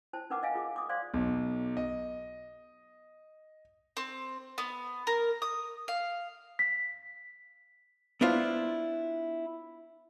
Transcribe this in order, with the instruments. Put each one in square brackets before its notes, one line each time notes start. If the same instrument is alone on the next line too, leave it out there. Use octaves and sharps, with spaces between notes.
[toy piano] E4 C5 A5
D#4 A#4 B4 F#5 D6
D#5 F5 G#5
F4 G#4 D6
D6 D#6
C5 D5 F5 C6 D6
[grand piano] B1
D#5
[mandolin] C4
B3
A#4
D#6
F5
[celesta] B6
[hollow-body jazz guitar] B3 D4 E4 F4 C5